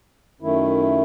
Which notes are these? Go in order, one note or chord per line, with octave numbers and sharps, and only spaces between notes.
F#2 D#3 A3 E4